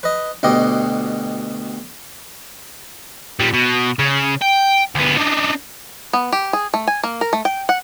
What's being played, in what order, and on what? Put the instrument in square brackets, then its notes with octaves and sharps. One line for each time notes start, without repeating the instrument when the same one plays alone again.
[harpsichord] B4 D#5
D2 B2 G4 D#5
[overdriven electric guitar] A#2 G3
B2
C#3
G5
D2 B3
D4 D#4
[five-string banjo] B3
G4
G#4
A3
G#5
A#3
A#4
A3
G5
F#5